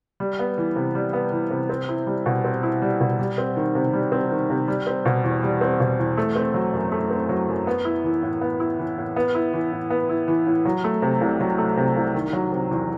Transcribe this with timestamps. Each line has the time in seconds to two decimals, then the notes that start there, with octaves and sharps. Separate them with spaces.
0.20 G3
0.39 B3
0.58 E3
0.76 C3
0.95 G3
1.13 B3
1.32 E3
1.50 C3
1.69 C4
1.89 E4
2.07 G3
2.26 B2
2.44 C4
2.63 E4
2.82 G3
3.00 B2
3.19 G3
3.38 C4
3.56 D#3
3.75 C3
3.93 G3
4.12 C4
4.31 D#3
4.50 C3
4.68 G3
4.87 C4
5.05 B2
5.24 E2
5.43 G3
5.61 C4
5.80 B2
5.99 E2
6.17 A3
6.36 C4
6.54 F#3
6.73 F#2
6.92 A3
7.11 C4
7.29 F#3
7.49 F#2
7.67 B3
7.85 E4
8.04 E3
8.23 A2
8.42 B3
8.60 E4
8.79 E3
8.98 A2
9.16 B3
9.35 E4
9.54 E3
9.72 A2
9.90 B3
10.09 E4
10.28 E3
10.47 A2
10.65 F#3
10.84 A3
11.02 C3
11.21 C2
11.41 F#3
11.58 A3
11.77 C3
11.97 C2
12.14 D#3
12.33 F#3
12.52 C3
12.71 E2